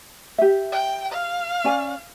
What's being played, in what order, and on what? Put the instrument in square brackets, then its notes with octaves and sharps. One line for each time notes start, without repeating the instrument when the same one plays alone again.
[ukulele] G4 E5
[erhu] G5
F5
[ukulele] C#4 D5 G#5